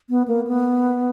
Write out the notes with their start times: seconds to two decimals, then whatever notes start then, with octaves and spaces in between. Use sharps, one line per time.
0.10 B3
0.28 A#3
0.47 B3